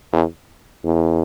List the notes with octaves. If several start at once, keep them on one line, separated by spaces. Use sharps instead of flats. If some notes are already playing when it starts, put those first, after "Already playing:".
E2
E2